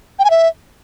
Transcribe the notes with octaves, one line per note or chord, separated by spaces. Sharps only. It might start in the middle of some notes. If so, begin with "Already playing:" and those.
G5
G#5
E5